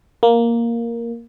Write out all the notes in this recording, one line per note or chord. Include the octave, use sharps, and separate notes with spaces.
A#3